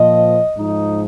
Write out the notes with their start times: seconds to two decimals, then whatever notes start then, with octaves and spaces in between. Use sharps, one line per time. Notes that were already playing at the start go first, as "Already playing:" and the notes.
Already playing: A#2 F3 D#5
0.57 G#2 F3 D#4